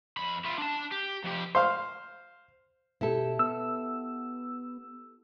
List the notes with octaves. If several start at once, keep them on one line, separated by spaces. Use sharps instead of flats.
F2 B5
E4 F4
D4 A5
G4
F2 G4
C5 F5
B2 E4 G4 A4
B3 E6